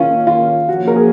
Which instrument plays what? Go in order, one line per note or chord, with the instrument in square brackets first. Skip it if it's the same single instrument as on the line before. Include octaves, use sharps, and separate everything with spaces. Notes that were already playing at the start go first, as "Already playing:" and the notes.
Already playing: [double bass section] D#3 A#3 C#4 [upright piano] F4
[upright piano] F4
[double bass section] F3 A#3 C#4 [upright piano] F#4
[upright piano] A#4
G#4